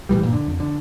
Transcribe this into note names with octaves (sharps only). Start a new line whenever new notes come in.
A2 C#3 E3 G3
G2 A#2
D3
F2
D3